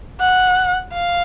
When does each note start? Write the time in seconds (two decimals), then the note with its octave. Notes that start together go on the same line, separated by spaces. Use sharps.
0.20 F#5
0.93 F5